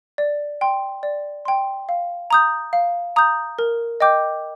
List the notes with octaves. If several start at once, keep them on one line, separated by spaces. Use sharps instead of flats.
D5
G5 C6
D5
G5 C6
F5
A#5 D#6 G6
F5
A#5 D#6 G6
A#4
D#5 G5 D6 G6